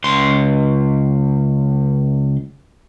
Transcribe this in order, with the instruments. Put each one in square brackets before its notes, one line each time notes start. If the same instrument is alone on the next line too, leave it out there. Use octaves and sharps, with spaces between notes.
[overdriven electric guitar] C#2 C6